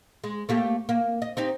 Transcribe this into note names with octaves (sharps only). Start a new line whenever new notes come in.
G#3
A3 A#3 G4
A#3
D#5
C4 D#4 G4